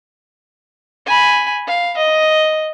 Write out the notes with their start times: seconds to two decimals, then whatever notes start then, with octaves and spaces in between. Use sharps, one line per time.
1.06 G#5 B5
1.67 F5
1.97 D#5